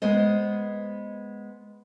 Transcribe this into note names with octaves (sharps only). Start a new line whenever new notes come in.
G#3 B3 C5 D#5